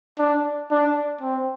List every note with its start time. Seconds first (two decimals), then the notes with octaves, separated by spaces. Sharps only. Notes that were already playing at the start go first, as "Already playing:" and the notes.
0.19 D4
0.71 D4
1.21 C4